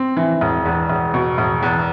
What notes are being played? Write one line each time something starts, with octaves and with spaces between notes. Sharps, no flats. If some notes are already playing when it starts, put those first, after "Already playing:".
Already playing: C4
E3
E1
E2
E1
B2
E1
E2